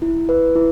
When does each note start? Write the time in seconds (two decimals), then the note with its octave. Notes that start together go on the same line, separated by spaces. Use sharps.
0.02 E4
0.29 B4
0.55 E4